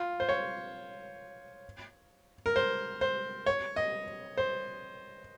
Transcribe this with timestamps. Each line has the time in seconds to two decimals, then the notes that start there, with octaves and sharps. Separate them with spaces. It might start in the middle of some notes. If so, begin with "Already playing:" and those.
Already playing: F4
0.20 C5
0.29 C#5
2.46 A#4
2.56 C5
3.01 C5
3.46 C#5
3.76 D#5
4.38 C5